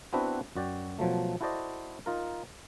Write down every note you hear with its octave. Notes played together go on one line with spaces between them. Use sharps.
B3 C4 D4 E4 F#4 B4
F#2 F#4 D5 G5
B2 F3 F#3 A3
E4 F#4 A4 C5 D5 D#5
D#4 F4 A#4